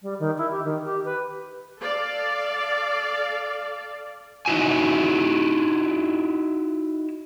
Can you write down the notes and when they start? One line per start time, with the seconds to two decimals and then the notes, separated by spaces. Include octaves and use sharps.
0.02 G3
0.19 D#3
0.37 E4
0.51 G4
0.64 D#3
0.84 G4
1.05 B4
1.79 A4 D5 F5
4.46 D#4 E4 F#4 G#5